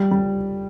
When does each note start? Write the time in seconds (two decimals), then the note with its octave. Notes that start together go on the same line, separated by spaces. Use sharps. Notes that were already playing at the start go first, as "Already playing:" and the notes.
Already playing: G3
0.11 G3